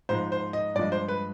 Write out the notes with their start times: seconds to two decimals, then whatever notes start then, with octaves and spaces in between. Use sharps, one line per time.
0.09 G#2 F3 G#3 C5
0.32 C5
0.53 D#5
0.75 G2 F3 G#3 D5
0.92 C5
1.08 B4